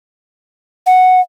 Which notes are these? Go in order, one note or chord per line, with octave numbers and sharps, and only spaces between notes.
F#5